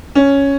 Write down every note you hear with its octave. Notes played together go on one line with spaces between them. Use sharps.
C#4